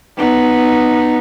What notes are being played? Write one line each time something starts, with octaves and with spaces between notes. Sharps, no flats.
B3 D#4